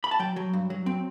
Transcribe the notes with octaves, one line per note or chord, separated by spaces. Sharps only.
B5
A5
F#3 G5
F#3
G2
F#3
C4